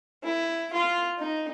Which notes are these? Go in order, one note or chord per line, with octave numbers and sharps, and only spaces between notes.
E4
F4
D#4